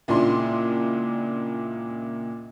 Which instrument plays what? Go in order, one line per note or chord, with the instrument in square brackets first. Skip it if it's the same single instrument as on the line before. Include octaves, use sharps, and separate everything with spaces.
[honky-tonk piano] C#2 A#2 D4 E4 C6